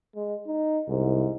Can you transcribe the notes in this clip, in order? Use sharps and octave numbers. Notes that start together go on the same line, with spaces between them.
G#3
D#4
C2 G#2